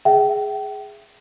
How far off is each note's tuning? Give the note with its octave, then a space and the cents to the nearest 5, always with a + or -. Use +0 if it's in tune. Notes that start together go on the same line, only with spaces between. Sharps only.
G#4 +0 E5 +20 G5 -35